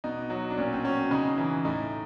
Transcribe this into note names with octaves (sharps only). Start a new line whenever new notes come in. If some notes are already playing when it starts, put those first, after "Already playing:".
B2 D#4
F#3
D4
A#2 C#4
C4
F#3 C#4
C#3 D#4
E3
A2 D#4